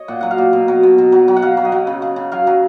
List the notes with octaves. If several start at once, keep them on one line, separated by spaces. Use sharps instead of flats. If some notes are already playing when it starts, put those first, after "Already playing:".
Already playing: C#5 D#5
A#2 F#5
F#3 F#5
F5
A#2
B2
F#3
B2
B2
F#3
F#3
F#5
F#3 F5
F#3
D#5
F#3
C#3
C#3
C#3
F#3 F5
F#3